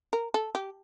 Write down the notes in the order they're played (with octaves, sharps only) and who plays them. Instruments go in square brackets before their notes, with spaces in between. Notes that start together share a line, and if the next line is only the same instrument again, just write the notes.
[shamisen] A#4
A4
G4